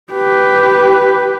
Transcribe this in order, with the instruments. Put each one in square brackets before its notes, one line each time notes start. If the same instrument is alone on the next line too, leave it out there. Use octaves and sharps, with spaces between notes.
[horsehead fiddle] G4 B4